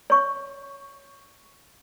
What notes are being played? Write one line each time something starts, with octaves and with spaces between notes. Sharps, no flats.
C#5 C#6